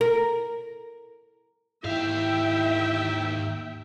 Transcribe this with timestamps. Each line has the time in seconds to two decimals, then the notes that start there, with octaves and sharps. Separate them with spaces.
0.01 A#4
1.84 D#2 G#2 E4 E5 F5 G5